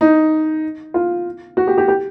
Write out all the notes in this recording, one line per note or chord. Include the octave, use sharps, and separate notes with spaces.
D#4
F4
F#4
G4
G4
G4